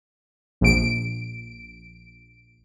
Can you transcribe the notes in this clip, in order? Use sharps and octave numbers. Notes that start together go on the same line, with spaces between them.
A#1 D7